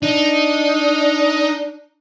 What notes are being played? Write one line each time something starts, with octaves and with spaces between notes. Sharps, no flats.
D4 D#4